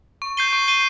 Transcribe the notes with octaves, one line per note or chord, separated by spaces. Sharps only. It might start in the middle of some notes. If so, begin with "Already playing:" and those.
C#6
G6 C7 D#7 G7
C#6
G6 C7 D#7 G7